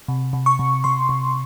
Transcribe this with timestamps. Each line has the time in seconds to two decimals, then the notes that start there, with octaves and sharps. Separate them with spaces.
0.08 C3
0.33 C3
0.46 C#6
0.59 C3
0.84 C3 C6
1.09 C3